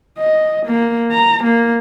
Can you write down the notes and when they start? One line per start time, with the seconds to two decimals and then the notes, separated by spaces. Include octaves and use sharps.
0.18 D#5
0.66 A#3
1.12 A#5
1.43 A#3